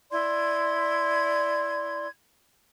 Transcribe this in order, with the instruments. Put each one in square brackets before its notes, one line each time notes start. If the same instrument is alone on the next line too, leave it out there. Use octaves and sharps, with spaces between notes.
[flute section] E4 D5 C6 G#6